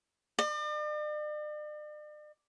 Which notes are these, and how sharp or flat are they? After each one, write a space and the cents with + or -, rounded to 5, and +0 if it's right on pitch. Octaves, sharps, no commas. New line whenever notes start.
D5 +45